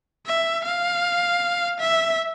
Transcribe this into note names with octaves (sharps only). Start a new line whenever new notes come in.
E5
F5
E5